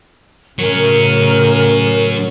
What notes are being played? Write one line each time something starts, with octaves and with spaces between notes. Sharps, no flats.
A2 C#3 F#3 C#4 A#4